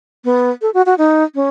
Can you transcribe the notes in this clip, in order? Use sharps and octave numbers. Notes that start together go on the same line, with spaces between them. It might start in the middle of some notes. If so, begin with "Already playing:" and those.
B3
A4
F#4
F#4
D#4
C#4